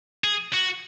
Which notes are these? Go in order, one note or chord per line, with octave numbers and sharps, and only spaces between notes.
G#4
F#4